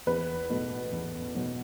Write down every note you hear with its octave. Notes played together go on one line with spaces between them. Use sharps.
E2 B4
B2 F#3 A3
E2
B2 F#3 A3